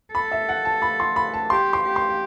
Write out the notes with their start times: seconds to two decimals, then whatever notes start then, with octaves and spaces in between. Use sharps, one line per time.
0.14 A4 B5
0.32 E5
0.49 F#5
0.65 A5
0.82 B5
1.00 C6
1.16 B5
1.34 A5
1.50 G4 C6
1.73 C6
1.84 G4
1.96 C6